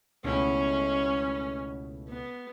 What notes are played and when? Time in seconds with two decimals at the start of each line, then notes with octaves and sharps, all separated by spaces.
0.24 C#2 B2 A3 C#4 E4
2.08 B3